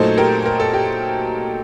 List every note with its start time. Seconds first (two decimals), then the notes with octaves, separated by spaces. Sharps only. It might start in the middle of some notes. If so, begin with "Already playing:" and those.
Already playing: A#2 F#3 A3 D#4 A4 C5
0.18 G4 A#4
0.46 A#4
0.60 A4
0.74 G4